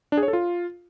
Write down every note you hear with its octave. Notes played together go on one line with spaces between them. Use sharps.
D4
G#4
C#5
A4
F4